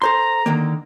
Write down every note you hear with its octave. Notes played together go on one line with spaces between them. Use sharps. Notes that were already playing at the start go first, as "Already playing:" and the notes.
A4 C5 A#5 C6
D3 D#3 A#3